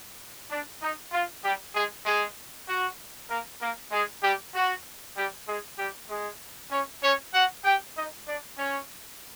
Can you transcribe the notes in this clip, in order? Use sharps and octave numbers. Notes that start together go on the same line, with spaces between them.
D4
D#4
F4
G3 G4
G#3 G#4
G#3 G#4
F#4
A#3 A#4
A#3 A#4
G#3 G#4
G3 G4
F#4
G3 G4
G#3 G#4
G3 G4
G#3 G#4
C#4 C#5
C#4 C#5
F#4 F#5
G4 G5
D#4 D#5
D4 D5
C#4 C#5